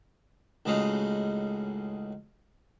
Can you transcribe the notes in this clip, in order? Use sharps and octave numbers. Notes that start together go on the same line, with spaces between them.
C#2 A2 G#3 C#4 D#4 F#4